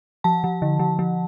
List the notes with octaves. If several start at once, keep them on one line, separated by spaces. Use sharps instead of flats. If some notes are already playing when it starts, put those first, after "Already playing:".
F3 A5
F3
D3
F3
F3